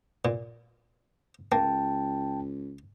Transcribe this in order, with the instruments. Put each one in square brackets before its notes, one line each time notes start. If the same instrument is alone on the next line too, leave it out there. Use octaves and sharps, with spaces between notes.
[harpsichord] A#2
[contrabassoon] C#2 [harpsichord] A#3 [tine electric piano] G5 A5